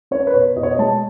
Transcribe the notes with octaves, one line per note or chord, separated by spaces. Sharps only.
C#4 C#5
B4
B2 C#5
B2 D#5
C#5
D#5
G#3 A5